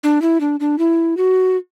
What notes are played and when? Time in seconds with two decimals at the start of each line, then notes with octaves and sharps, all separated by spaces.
0.04 D4
0.22 E4
0.40 D4
0.60 D4
0.78 E4
1.17 F#4